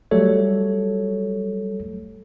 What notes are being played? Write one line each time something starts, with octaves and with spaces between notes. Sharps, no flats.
F#3 G3 A3 A4 C#5